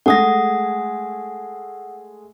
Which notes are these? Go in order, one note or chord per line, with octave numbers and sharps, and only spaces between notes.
G#3 A3 G#4 F#5 D#6 A#6